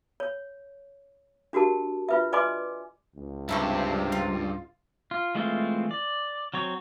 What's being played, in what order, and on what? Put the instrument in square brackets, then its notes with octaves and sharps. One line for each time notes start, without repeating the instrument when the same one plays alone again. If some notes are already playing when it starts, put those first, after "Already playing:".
[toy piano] C#5
D4 F#4 G4 A#4 A5
F4 B4 E5
B4 D5 D#5 G#5 C6 D6
[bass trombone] C#2
[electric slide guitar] G2 [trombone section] C3 [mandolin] E4 A4 C#6
[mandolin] F4
[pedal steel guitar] F4
E3 G#3 A3 C4 F4
D5
F#3 C4 C#5